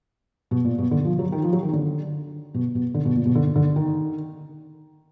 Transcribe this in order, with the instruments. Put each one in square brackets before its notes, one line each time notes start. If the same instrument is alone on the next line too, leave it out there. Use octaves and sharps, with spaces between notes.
[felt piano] B2
A#2
B2
D3
F3
F#3
D#3
F3
F#3
D#3
D3
B2
B2
D3
B2
A#2
B2
D3
D3
D#3